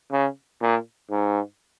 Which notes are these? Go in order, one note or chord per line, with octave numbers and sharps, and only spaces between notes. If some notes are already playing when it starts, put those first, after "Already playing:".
C#3
A#2
G#2